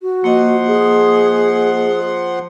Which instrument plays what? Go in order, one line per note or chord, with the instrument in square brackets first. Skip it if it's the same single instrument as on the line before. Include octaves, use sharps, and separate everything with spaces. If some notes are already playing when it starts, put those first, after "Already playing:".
[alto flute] F#4
[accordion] F3 F#5 C6 [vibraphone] A#3 D#5
[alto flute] G#4